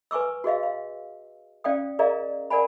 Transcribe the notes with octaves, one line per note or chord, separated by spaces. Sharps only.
B4 G#5 C#6 D6 E6
F#4 G#4 D#5 F5
F5
C#4 D5 F5 G5 D#6
G#4 A#4 D5 D#5 F5 A#5
A#4 D5 F#5 G#5 B5